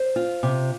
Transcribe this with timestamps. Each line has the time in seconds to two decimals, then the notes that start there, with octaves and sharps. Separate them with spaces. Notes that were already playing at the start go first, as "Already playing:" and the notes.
Already playing: C5
0.16 F4
0.43 C3